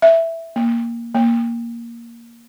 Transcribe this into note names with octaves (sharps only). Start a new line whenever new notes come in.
E5
A#3
A#3